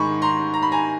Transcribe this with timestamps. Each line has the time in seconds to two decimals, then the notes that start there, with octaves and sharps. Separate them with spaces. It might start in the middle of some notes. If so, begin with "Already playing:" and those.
Already playing: G#2 D#3 G#3 B5 C#6
0.22 A#5 C6
0.54 A#5
0.63 B5
0.72 G#5 A#5